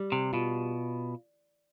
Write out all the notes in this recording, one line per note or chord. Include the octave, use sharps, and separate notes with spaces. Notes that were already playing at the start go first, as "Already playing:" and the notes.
Already playing: G3
C3
B2 F4